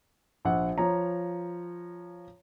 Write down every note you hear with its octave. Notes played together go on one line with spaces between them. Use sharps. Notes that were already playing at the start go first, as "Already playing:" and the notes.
A#1 F#5
F3 C#5 A#5